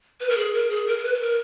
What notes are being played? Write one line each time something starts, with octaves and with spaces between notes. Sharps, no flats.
B4
A#4
G#4
A#4
G#4
A#4
A#4
B4
B4
A#4